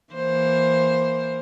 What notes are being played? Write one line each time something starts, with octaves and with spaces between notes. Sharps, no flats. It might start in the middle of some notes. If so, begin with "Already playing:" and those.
E3 A#3 C5